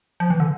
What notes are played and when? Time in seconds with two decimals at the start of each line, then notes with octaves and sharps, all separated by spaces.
0.20 F3
0.30 E3
0.40 D3